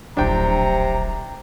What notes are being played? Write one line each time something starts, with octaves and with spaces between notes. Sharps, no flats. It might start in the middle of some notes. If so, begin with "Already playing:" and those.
D1 A#1 C3 D4 G5 A#5